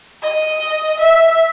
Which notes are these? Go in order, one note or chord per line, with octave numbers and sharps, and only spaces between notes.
D#5
E5